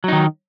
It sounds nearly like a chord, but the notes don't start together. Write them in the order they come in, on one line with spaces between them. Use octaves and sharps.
F#3 D#4 D#3